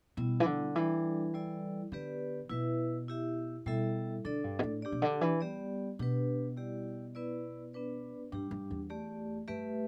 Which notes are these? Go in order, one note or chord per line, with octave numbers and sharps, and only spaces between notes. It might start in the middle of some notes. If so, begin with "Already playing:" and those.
B2 G3 B3 E4
E3
D3
E3 G3 D4 A4 D5
G3 E4 A4 D5
D3 B3 G4 B4 D5
B2 E4 B4 E5
E4 G4 E5
B2 G3 E4 A4 E5
D3 D4 A4 D5
G2
B2
A2
D4 G4 D5
B2
D3
E3
G3 B3 G4 D5
B2 D4 G4 B4
G3 E4 G4 D5
B3 E4 B4 D5
B3 D4 B4 D5
G2 G3 D4 G4
G2
E2
A3 G4 D5
G2 A3 G4 B4 E5